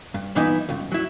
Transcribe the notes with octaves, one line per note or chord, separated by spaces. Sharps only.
G2
G2 A#2 E3 B3 D#4 E4
C#2 G2
F#3 E4